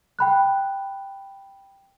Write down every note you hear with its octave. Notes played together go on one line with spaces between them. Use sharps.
G5 B5 F#6